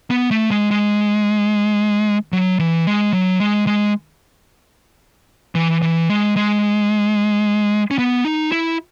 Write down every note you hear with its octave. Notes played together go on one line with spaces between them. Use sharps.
B3
A3
G#3
G#3
F#3
E3
G#3
F#3
G#3
G#3
E3
E3
G#3
G#3
C#4
B3
D#4
E4